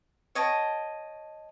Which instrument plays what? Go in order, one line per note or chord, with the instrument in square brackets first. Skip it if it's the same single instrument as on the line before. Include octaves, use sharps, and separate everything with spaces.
[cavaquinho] C#5 D#5 G5 A5